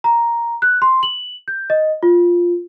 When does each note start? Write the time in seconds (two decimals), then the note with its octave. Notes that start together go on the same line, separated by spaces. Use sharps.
0.04 A#5
0.62 F#6
0.82 C6
1.03 F#7
1.48 G6
1.70 D#5
2.03 F4